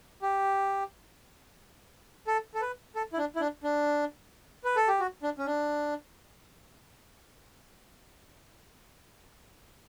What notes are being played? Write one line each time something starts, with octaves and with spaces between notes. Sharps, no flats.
G4
A4
A4
B4
A4
E4
D4
E4
D4
D4
B4
A4
G4
F#4
D4
C#4
D4